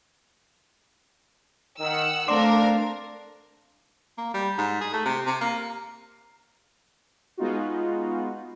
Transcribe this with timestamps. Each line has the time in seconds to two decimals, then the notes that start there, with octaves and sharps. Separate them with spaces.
1.79 D#3 F#5 E6
2.28 A3 C4 D4 A#4 D5 F5 C6 D6
4.18 A#3
4.34 G3
4.58 G#2
4.81 G#4
4.93 A3
5.06 C3
5.27 C3
5.41 A#3
7.37 G#3 B3 D#4 F4 F#4